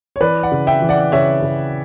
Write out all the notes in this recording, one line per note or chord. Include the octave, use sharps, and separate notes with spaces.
C#5
E3 B4 D5
D5 F#5
C#3
E5 G5
E3
D5 F#5
C#3 C#5 E5
C#3